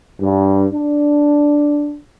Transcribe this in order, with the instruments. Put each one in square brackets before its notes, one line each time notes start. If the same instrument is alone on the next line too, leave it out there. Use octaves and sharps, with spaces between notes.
[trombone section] G2
D4